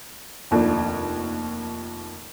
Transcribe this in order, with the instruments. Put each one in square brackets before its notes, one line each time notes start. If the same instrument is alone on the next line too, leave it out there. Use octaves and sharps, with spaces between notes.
[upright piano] F1 D#2 F3 D4